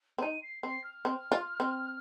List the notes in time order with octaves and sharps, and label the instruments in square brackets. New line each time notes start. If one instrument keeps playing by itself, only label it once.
[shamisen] C4
[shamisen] D#4 [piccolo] D#7
[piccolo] C7
[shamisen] C4 [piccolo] C7
[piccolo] F6
[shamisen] C4
F4
C4